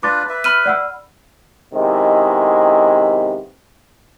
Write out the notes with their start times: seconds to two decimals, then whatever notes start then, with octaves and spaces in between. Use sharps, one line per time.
0.03 D4 F4 B4 D6 A6
0.29 B4 E5
0.44 B5 F6 D#7
0.66 D5 F#5 E6
1.74 C3 D#3 G#3 B3 E4